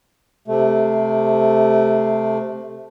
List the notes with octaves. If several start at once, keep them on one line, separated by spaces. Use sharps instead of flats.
C3 A3